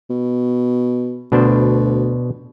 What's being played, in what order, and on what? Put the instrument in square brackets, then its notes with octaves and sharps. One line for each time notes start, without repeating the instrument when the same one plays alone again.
[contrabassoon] B2
[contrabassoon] D2 [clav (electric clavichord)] B2 D4 C5